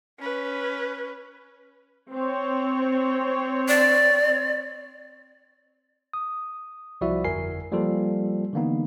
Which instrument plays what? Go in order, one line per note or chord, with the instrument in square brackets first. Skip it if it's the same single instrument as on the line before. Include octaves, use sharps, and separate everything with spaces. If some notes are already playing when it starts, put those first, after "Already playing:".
[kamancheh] C#4 B4
[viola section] C4 C#5
[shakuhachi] D5
[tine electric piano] D#6
C2 F3 E4 F#4 D5 E5
G1 F2 A#4 G#5 C7
F3 G3 A#3 F4 A4
D3 E3 A#3 B3 D#4